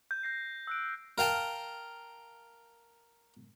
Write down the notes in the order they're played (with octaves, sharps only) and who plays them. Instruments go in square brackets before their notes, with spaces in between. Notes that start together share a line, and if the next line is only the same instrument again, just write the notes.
[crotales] G6
G6 A#6 C7
E6 F#6 D7
[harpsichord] A#4 F5 G5 A5